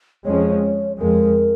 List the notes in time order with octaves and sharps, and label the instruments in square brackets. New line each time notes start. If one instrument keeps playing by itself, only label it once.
[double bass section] F2 F3 G#3 C#4 [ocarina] C#5
[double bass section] F2 F3 G#3 [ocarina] A#4